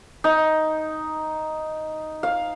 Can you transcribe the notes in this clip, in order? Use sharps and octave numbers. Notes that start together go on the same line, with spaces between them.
D#4
F5